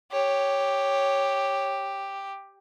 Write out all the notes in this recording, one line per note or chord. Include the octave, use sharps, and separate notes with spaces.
G4 C#5